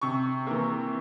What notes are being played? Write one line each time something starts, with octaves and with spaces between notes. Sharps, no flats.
C3 C#6
E3 A#3